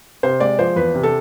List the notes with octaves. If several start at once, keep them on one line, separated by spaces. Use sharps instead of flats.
C3 C5
G#3 D5
F3 C5
E2 B4
C3
A4